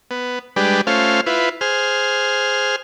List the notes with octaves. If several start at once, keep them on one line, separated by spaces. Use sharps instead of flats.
B3
G3 G#3 D4 G4 B4
A3 C#4 F4 C5 F5
E4 F4 B4
G#4 C5 F6